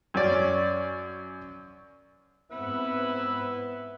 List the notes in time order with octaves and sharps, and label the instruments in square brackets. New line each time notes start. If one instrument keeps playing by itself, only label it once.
[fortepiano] F#2 C#4 D5
[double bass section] G#2 C4 [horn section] B3 B4 [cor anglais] E4